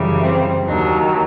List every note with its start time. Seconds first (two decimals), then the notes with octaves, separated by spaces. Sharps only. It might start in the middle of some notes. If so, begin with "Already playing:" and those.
Already playing: F#2 C#3 E3 G3
0.22 C4
0.67 D#2 D#3 F#3 D4